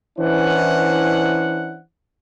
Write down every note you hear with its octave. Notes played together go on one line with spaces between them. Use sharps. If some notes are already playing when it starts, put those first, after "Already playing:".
E3 C#4 D4 E4 C5 F#5